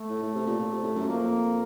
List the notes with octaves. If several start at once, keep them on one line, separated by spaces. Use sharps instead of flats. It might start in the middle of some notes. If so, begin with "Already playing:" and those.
Already playing: A3
A2
A2
C3
A#2
A#2
C3
A2
F#2
F2 A#3